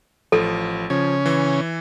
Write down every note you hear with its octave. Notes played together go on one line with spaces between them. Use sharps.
A1 F3 A4 D#7
C#3 F3 C#4 G#6
E3